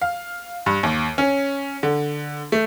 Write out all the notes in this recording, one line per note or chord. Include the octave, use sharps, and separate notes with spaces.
F5
G2
D#2
C#4
D3
A3